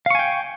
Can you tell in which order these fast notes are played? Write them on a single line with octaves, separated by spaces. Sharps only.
F5 C#6 G#5 G5